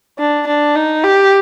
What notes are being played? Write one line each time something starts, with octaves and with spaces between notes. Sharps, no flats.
D4
D4
D#4
G4